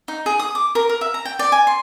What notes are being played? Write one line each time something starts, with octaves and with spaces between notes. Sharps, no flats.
D#4
G#4
D#6
D6
A#4
A#4
E5
A#5
G5
D5
G#5
C6